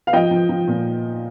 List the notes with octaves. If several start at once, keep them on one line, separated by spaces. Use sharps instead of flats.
F5
F3 D#5 G5
F3
F3
A#2